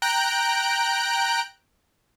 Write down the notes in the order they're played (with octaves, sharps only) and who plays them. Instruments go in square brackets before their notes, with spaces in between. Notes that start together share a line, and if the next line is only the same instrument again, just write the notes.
[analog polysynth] G5 A#5 F#6 D7